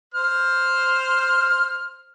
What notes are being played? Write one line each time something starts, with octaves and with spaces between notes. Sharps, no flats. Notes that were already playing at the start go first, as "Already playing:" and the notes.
C5 F6